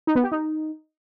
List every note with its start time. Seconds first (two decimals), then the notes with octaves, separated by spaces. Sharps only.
0.07 D#4
0.15 B3
0.24 G4
0.32 D#4